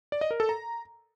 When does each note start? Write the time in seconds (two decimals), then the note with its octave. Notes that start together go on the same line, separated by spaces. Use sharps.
0.12 D5
0.21 D#5
0.31 A#4
0.40 A4
0.49 A#5